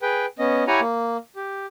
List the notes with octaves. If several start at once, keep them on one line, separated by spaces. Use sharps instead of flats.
G#4 B4 G5
B3 C#4 D#5
E4 G4 C#5 F#5 G#5 A#5
A#3
G4